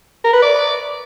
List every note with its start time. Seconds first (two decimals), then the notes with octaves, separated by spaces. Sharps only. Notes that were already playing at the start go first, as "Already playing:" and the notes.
0.24 A#4
0.33 B4
0.42 D5